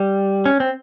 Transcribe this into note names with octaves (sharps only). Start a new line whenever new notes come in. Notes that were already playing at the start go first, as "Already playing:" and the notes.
Already playing: G3
C#4
C4